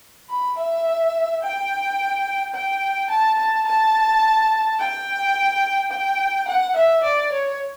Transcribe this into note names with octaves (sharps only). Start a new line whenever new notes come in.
B5
E5
G5
G5
A5
A5
A5
G5
G5
F#5
E5
D5
C#5